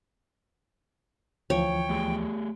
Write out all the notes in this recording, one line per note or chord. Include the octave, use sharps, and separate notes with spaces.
D2 E3 F3 C#5 G5
A3 G4 G#4